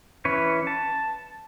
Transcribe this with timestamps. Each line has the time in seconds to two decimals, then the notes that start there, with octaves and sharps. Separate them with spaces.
0.25 E3 C#4 B4 C#5
0.67 A5